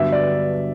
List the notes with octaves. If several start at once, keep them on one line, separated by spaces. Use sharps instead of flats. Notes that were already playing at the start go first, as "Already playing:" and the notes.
Already playing: G2 D3 F#3 B3 E5
D5